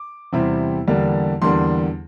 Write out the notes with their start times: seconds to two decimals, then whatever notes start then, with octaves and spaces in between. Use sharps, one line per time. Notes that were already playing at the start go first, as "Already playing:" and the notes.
Already playing: D6
0.33 E2 C3 G3 C4 E4
0.87 E2 D3 G3 A#3 D4
1.42 E2 D3 G3 A#3 D4 C6